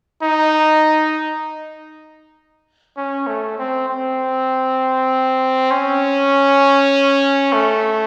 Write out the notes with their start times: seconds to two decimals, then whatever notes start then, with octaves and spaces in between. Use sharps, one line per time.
0.23 D#4
2.97 C#4
3.27 A3
3.58 C4
3.89 C4
5.71 C#4
7.53 A3